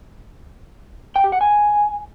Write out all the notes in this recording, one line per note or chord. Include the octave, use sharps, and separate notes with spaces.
G5
G4
F#5
G#5